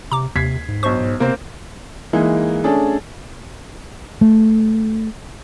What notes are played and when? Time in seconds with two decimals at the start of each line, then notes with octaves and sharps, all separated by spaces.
0.12 C3 A#5 D6
0.36 D#2 C3 G#6 B6 C7
0.68 G#2
0.83 B1 C5 C#6
1.00 G#2
1.20 C3 A#3 C4
2.13 E3 G#3 A#3 D#4 E4
2.64 A3 C#4 D4 G#4 A4
4.21 A3